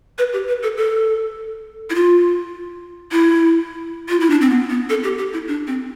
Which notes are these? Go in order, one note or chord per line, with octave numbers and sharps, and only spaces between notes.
B4
G4
B4
A4
A4
E4
F4
E4
F4
E4
D4
C4
B3
B3
A4
G4
G4
E4
D4
C4